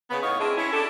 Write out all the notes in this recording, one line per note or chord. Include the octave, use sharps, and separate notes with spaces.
C#3 B3
A2 B3 D#4 C#5 D#5 F5
C4 D4 E4 F4 G#4
C#4 E4
D4 G4 A4